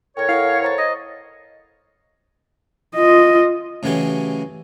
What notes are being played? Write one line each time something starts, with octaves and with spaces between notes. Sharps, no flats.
A2 A#4 C#5 G5 C#6
E4 A4 F5 F#5
C5 A#5 A6
D#5 D#6
F4 D#5
A2 C#3 E3 F#3 C#4 G4